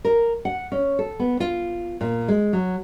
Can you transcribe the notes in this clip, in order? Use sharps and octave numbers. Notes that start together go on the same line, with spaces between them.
A#4
F#5
C#4
A4
B3
F4
A#2
G#3
F#3